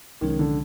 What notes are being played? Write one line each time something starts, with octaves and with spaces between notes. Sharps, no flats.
C2 C3 D#3 F3 G#3 C#4
D3